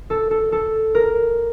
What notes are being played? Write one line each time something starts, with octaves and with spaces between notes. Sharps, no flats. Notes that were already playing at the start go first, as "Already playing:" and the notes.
A4
A4
A4
A#4